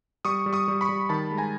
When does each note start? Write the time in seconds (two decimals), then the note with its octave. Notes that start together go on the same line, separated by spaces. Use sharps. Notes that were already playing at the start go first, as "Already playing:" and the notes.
0.25 G3 C#6 D#6
0.46 G3
0.53 C#6 D#6
0.68 G3
0.81 B5 C#6
0.89 G3
1.09 D#3 A5 B5
1.31 G#3
1.38 G#5 A#5